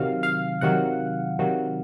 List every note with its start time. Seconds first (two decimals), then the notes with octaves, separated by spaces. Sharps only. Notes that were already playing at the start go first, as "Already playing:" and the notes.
Already playing: C3 D#3 F#3 F5
0.23 F5
0.61 C3 D#3 F#3 F#5
1.39 C3 D#3 F#3